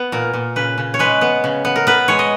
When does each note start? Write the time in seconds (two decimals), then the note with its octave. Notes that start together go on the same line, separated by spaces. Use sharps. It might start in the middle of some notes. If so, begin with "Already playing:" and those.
Already playing: B3
0.12 A#2 A#4
0.33 A#2
0.56 C#3 B4
0.78 C#3
0.94 C#5
0.99 G#3 B4
1.21 B3
1.44 C#3
1.65 B3
1.76 A#4
1.87 B3 B4
2.08 G#3 C#5
2.19 D#5